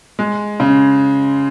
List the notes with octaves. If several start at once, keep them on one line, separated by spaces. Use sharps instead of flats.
G#3
C#3